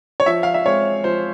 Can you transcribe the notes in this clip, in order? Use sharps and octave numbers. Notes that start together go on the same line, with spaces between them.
C#5
F3 E5
F5
E5
G#3 C4 C#5
F3 C5